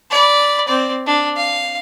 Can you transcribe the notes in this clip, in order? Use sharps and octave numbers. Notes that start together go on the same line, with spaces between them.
D5 B5
C4 D5
D4
F5